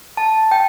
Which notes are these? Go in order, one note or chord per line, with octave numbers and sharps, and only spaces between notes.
A5
G5